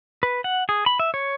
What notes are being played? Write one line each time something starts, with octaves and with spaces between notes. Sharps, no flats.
B4
F#5
G#4
B5
E5
C#5